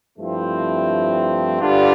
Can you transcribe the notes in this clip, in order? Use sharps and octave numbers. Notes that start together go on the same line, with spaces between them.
G2 F3 A3 C4 E4
G2 D3 G3 D4 F4